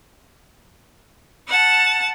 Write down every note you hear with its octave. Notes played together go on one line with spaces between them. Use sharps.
F#5 A5